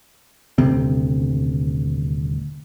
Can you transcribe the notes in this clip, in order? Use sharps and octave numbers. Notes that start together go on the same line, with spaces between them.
D#1 D2 C3 C4